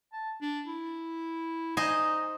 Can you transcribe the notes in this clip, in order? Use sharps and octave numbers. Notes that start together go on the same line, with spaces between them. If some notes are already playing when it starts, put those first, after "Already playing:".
A5
D4
E4
D#4 C5 D#5 G#5